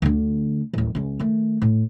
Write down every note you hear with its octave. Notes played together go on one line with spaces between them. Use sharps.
D2 D3
D1 A1
C#2 C#4
D#3 A3
A2